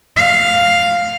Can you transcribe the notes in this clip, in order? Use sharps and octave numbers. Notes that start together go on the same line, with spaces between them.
F5